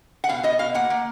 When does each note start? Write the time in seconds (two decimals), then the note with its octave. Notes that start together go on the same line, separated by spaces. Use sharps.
0.24 F#5
0.29 B2 F5
0.43 B2 D#5
0.59 B2 F5
0.74 A#3 F#5
0.90 A#3